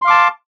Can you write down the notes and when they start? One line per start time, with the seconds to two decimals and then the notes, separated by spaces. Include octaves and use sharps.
0.02 C6
0.05 F5
0.07 D6
0.10 A5